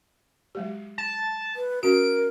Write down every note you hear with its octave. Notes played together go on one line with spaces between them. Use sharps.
F#3 G#3 G4
A5
B4
C#4 F#4 A#4 D7